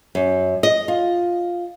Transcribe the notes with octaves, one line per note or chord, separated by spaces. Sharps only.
F#2
D#5
F4